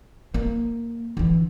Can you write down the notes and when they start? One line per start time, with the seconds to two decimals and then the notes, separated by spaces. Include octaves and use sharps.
0.34 A#3
1.17 D3 E3